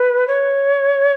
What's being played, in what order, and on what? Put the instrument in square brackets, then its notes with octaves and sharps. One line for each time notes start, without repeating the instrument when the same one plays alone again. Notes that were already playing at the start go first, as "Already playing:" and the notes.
Already playing: [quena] B4
C#5